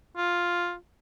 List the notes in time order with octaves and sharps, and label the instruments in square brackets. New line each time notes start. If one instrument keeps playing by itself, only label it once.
[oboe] F4